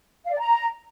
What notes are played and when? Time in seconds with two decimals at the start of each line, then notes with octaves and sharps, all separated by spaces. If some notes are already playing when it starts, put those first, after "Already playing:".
0.25 F5
0.32 D5
0.39 A#5